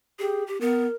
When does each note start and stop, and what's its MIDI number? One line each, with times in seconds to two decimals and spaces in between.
0.19 0.46 67
0.19 0.44 68
0.47 0.60 67
0.61 0.87 59
0.61 0.95 70